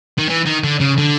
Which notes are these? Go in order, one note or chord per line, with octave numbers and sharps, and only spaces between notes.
D#3
E3
D#3
D3
C#3
D3